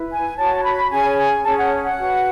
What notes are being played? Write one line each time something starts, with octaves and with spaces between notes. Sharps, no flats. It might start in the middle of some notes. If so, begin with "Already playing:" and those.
Already playing: E4 B4
G#5
F#4 C#5 A5
B5
C#4 G#4 C#5 G#5
G#5
C#4 G#4 C#5 A5
F#5
F#5
F#4 B4